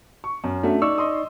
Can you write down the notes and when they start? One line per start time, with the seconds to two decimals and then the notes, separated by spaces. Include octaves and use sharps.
0.24 C#6
0.44 F#2
0.63 A3 C#4 D4 F#4 E5
0.82 D#4 D5 C#6 E6
0.98 D#5 C6 D#6